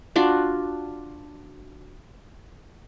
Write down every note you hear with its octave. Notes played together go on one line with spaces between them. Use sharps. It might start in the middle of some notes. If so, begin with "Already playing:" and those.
D4 F4 F#4